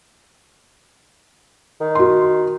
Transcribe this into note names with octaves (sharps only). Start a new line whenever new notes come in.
D#3
F#4 C6